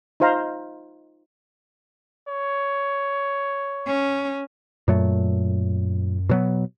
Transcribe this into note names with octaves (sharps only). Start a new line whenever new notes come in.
D#4 F4 C5 F5 A#5
C#5
C#4
F#2 A#2 F#3 A3
B2 F#3 B3